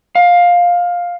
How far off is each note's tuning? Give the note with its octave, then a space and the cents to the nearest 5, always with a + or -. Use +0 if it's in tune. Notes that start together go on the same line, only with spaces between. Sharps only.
F5 +15